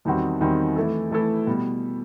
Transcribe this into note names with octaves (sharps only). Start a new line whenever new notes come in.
E2 D#3 G3 C4 F#4
E2 D#3 G3 C4 F#4
E3 A3 E4 A4
E3 A3 E4 A4
B2 G3